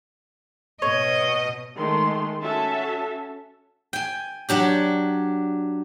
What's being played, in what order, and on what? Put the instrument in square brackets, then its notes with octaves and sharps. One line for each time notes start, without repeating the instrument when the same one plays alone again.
[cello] B2 D#5 [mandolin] C#5
[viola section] D#3 G#3 A3 C6
C#4 F#4 A4 E5 A5
[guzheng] G5 G#5
F#3 D4 G4